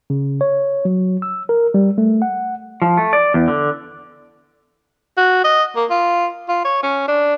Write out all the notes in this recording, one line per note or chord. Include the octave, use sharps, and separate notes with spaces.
C#3
C#5
F#3
E6
A#4
G3
A3
F#5
F3
A3
D5
E2
D3
F#4
D#5
A#3
F4
F4
C#5
C#4
D4